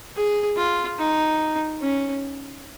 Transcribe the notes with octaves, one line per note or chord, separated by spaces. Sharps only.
G#4
F4
D#4
C#4